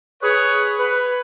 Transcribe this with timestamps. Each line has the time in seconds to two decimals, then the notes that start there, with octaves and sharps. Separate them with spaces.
0.23 G#4 B4 C#5
0.79 B4